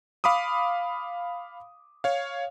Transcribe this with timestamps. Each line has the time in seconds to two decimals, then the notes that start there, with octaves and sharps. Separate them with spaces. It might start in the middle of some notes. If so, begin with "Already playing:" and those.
0.24 F5 B5 D6 D#6
2.04 C#5 F5